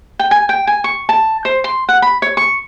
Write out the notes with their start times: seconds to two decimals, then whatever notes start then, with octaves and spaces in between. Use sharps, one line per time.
0.19 G5
0.31 G#5
0.49 G5
0.67 G#5
0.84 C#6
1.09 A5
1.45 C5
1.64 C6
1.89 F#5
2.02 B5
2.22 C#5
2.37 C#6